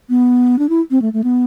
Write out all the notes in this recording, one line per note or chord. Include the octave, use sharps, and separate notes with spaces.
B3
D4
E4
C4
A3
A3
B3